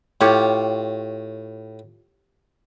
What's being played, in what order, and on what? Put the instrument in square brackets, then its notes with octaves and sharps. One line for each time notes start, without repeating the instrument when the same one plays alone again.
[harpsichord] A2 [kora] F4 G4 C#5